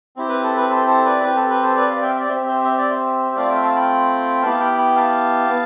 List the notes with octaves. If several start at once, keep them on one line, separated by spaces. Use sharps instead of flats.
C4 E4 G4
B4
A4
B4
A4 C5
A4 C5
B4 D5
C4 G4 B4
A4
B4
A4 C5
B4 D5
D5 F5
E5 G5
D5
C4 G4 C5 E5
C5 E5
E5
D5
C5 E5
A3 C4 F4 D5 F5
E5 G5
F5 A5
G5 B5
B3 E4 G4 F5 A5
G5 B5
G5 B5
F5 A5
B3